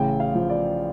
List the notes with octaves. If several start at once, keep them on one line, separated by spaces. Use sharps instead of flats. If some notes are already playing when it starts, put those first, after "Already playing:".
Already playing: A1 C#3 G5
F5
F3
D5